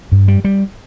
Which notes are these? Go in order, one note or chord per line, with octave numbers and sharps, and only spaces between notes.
G2
G3
G3